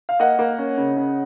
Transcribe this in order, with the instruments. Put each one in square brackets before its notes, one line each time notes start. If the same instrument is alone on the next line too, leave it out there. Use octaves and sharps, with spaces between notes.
[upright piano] F5
A#3 D#5 F#5
A#3
C#4
C#3
C#3